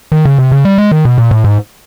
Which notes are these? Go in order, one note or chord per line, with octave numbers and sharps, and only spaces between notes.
D#3
C#3
C3
C#3
G3
G#3
D#3
B2
A#2
A2
G#2